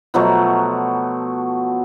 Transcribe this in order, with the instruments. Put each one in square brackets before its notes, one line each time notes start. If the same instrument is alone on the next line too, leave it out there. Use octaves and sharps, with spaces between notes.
[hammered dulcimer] B2 F3 F#3 A3